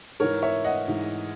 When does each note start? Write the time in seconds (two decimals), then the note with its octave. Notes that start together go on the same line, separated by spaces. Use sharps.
0.20 G#2 E3 A#4 C#5
0.42 C#5 E5
0.64 D#5 F#5
0.88 G#2 E3